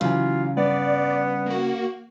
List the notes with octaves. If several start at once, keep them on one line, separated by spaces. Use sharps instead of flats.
C#3 E3 F#3 F4
G2 B3 D5
A#3 F#4